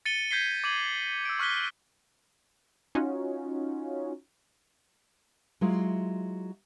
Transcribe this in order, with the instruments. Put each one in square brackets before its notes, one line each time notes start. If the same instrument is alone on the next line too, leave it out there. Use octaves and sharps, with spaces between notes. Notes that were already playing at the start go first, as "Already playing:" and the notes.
[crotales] A6 C#7 D#7 G7
G6 G#6 B6 C7 G7
D6 G#6 D#7 F#7
E6 D7
C#6 F6 F#6 B6 G7
[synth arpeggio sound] C#4 D#4 F4 F#4
[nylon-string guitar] F#3 G#3 E4 F4